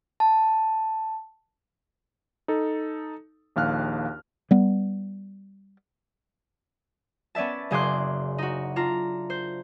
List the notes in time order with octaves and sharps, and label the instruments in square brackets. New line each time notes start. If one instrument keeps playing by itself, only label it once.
[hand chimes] A5
[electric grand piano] D#4 A4
A#1 D#2 F5 F6 F#6
[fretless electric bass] G3 B3
[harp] B3 C#4 D5 E5 A5
F#1 C#3 G#4 C6 D6 F#6
D#4 F#4
D4 F4 A#5
C5